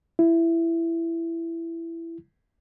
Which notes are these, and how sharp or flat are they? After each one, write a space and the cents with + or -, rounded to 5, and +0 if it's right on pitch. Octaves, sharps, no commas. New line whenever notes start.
E4 +15